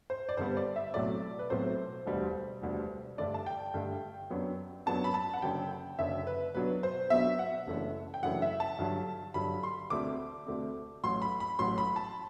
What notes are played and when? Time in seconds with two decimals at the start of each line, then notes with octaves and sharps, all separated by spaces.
0.10 C5
0.29 D5
0.37 G2 D3 G3 B3 C5
0.57 D5
0.76 E5
0.94 B1 A2 F#3 A3 C4 D5
1.39 B4
1.50 B1 A2 F#3 A3 C4 C5
2.06 E1 D2 D3 G3
2.62 E1 D2 D3 G3
3.18 G2 D3 A3 D4 D5
3.34 A5
3.46 G5
3.74 G2 D3 A3 D4
4.30 F#2 F#3 B3 D4
4.86 F#2 F#3 B3 D4 A5
5.04 B5
5.14 A5
5.34 F#5
5.42 F#1 F#2 D3 G5
5.99 F#1 F#2 D3 E5
6.27 B4
6.55 B1 B2 F#3 B3 D4 B4
6.83 C5
7.10 B1 B2 F#3 B3 D4 E5
7.39 F#5
7.67 F#1 F#2 E3 A3 D4
8.14 G5
8.23 F#1 F#2 E3 A3 D4 F#5
8.42 E5
8.60 A5
8.79 G2 D3 F#3
9.34 G2 D3 F#3 B5
9.63 C6
9.90 D2 D3 A3 C4 D6
10.47 D2 D3 A3 C4
11.03 A1 A2 F#3 C6
11.22 B5
11.40 B5
11.59 A1 A2 F#3 C6
11.78 B5
11.96 A5